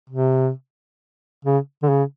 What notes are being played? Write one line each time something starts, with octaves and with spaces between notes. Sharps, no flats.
C3
C#3
D3
C#3